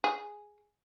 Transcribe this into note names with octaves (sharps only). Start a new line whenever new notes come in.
G#4